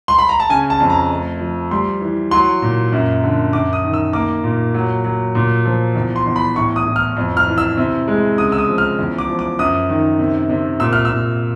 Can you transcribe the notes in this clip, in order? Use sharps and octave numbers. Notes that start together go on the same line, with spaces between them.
C6
B5
A#5
A5
C#3 G#5
A5
F2
A#5
A3
F3
G3 C6
E3
F#3 C6
A#2
F#2
D3
F#2 D6
D#6
D#3
E6
A#3 D6
A#2
F#3
F#3
A#2
F3
E2
C6
E2
B5
A2 C#6
D#6
A2
F6
F2
F6
E3
E6
C3
G#3
C#3 D#6
E6
D#6
F3
F6
E2
D6
F3
D6
F#2 D#6
D#3
C3
C3
A#2 E6
F6
E6
A#2